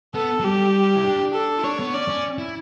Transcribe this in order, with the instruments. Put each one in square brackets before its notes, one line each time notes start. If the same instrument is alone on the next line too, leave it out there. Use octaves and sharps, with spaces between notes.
[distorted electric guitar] B3 [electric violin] A4
[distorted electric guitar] F#3
[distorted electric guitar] G3 [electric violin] G4
[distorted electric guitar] E4
D4
D4
[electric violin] A4
[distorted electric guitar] E4
[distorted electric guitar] D4 [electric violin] C#5
[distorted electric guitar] B3
[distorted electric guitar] C#4 [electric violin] D5
[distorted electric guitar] C#4
E4